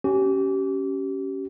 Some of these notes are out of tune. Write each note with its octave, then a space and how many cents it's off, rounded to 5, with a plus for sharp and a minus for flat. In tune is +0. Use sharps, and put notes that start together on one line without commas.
C#4 +0 G4 -30